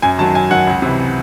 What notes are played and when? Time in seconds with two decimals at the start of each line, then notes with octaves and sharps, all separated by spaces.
0.02 F#2 G#5
0.18 D#3 F#3 A5
0.34 F#2 G#5
0.50 D#3 F#3 F#5
0.67 C#2
0.82 C3 E3